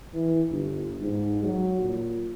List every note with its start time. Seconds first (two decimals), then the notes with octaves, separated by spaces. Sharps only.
0.14 E3
0.50 G1
1.01 G#2
1.43 F#3
1.80 A#2